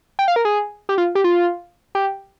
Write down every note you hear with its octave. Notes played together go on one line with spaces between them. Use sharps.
G5
F5
A#4
G#4
G4
F4
G4
F4
G4